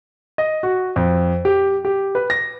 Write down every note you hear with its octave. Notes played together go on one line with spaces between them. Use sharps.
D#5
F#4
F2
G4
G4
B4
A#6